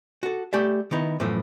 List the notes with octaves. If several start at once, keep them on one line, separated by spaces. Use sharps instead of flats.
F#4 A4
A3 G4 D5 E5
D#3 B3 D#4 E4
F#2 A2 E3 F3 A3